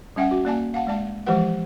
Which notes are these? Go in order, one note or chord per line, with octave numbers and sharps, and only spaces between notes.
G3 C#4 E5 F#5 G5
F#4
A#3 D5 G#5 A5
F5 F#5 A5
G#3 D5 A5
E3 F3 G#3 G4 B4 F#5